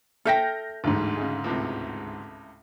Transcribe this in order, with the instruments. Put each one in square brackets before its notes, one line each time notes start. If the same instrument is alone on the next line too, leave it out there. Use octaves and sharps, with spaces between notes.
[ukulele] A4 E5 G5 [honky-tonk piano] F6 G6 A#6
[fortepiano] A1 [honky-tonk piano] D2 G#2
[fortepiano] C#3 G#3
C#2 A2 C3